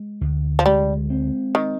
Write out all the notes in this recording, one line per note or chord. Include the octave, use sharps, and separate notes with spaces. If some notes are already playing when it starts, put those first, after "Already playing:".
Already playing: G#3
D2
F3
G3 G#3
C4
D#3